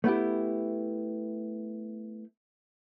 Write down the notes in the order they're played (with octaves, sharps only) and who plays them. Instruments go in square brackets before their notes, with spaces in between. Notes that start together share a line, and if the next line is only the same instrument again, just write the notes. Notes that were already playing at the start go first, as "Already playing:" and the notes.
[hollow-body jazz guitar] A3 B3 E4 G4